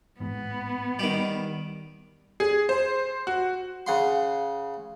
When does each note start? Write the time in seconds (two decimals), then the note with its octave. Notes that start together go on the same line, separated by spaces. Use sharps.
0.20 A1 G#2 B3
0.99 D#3 G3
2.40 G#4
2.69 C5
3.27 F#4
3.87 C#3 F#5 C6